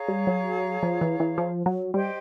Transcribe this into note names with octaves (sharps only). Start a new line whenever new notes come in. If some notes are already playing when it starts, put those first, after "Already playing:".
Already playing: G#4 C#5 F5 A#5
G3
F#3
F3
E3
E3
F3
F#3
G3 G4 C5 D#5 G5